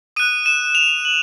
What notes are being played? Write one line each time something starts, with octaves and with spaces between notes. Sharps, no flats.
D#6 F#6 D#7
E7
F7
F#7